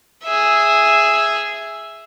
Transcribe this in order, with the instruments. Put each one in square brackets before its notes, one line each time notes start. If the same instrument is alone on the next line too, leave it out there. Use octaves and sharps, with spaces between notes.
[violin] G#4 E5